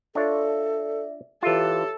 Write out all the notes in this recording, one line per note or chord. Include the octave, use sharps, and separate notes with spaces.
D4 F4 A4 C#5 D5 E5
E3 F4 G4 A4 C#5 E5